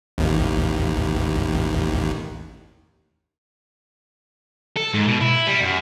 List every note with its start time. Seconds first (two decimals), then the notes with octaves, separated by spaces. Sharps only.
0.18 A1 D#2
4.76 A4
4.94 G#2
5.08 B2
5.21 E4
5.47 G3
5.62 F#2